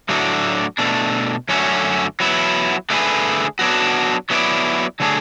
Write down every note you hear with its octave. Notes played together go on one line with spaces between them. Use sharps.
A2 F#3 A3 D4 F#4
B2 A3 D4
F#2 D3 A3 C#4 F#4
F#3 B3 E4
D3 A3 D4 G#4 B4
F#3 B3 D4 F#4
F#3 B3 E4 B4 D5
D3 F#3 A3 D4 G#4